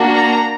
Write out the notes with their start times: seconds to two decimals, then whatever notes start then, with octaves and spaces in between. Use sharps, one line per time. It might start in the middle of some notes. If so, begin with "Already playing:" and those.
Already playing: A#3 D4 F#4
0.15 A#5